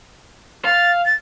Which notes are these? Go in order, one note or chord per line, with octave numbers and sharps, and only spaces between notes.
F5 A6
A6